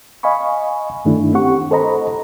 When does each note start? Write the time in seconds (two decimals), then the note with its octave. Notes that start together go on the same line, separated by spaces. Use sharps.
0.23 D#5 F5 G#5 B5 C#6
1.05 G2 D#3 A3 D4 E4
1.34 C4 G4 F#5 C#6
1.71 A4 C5 D#5 A#5 B5